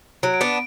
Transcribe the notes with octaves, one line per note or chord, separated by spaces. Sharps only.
F#3 D7
D7
B3 D4